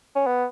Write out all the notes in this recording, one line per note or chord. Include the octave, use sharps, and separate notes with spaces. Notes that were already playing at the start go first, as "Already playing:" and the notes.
C#4
B3